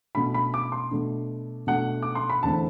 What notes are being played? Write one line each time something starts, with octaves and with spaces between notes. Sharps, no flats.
B2 A3 D4 B5
B5
D6
C6
B2 A3 D4
B2 A3 D4 F#5
D6
C6
B5
E2 D3 A3 C4 A5